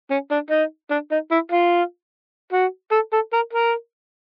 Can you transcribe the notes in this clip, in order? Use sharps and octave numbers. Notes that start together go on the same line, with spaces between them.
C#4
D4
D#4
D4
D#4
E4
F4
F#4
A4
A4
A#4
A#4